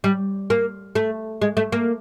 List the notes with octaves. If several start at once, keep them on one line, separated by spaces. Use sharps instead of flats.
G3
A#3
A3
G#3
A3
A#3